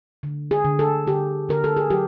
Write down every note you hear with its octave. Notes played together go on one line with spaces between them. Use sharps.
D3
G#4
D3
A4
D3 G4
D3 A#4
A4
G#4
F#3 G4